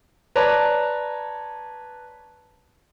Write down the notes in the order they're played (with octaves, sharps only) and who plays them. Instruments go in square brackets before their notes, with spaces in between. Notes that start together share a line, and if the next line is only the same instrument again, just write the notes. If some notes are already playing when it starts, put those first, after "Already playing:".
[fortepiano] B4 C#5 D5 A5 A#5